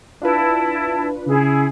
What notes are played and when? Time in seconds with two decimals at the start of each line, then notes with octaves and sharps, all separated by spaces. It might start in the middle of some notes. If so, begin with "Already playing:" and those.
0.22 D4 E4 F4 B4 A5
1.27 C#3 E4 G#4